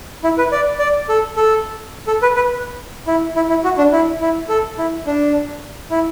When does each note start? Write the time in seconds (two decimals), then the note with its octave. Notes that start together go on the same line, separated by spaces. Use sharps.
0.24 E4
0.38 B4
0.52 D5
0.79 D5
1.09 A4
1.36 A4
2.07 A4
2.22 B4
2.36 B4
3.07 E4
3.36 E4
3.49 E4
3.64 F#4
3.78 D4
3.92 E4
4.21 E4
4.49 A4
4.78 E4
5.07 D4
5.91 E4